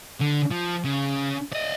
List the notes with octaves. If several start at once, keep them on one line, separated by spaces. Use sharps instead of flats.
D3
F3
C#3
D5 D#5